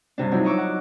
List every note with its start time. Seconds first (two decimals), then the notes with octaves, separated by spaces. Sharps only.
0.18 G2 C3 D4
0.31 F3 F#3 C4 D#4 E4
0.44 D#5 A#5 C#6 D6 E6
0.58 F#5